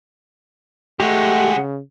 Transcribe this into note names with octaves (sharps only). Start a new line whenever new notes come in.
G#3 A3 F#4 G4 F#5
C#3